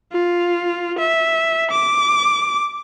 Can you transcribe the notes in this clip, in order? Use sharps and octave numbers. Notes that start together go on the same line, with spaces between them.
F4
E5
D6